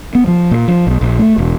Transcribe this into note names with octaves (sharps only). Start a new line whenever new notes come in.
B3
F3
A#2
F3
B1
A#1
A3
E1